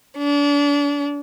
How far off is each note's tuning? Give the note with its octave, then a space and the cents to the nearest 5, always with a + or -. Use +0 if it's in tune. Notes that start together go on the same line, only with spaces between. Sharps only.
D4 -35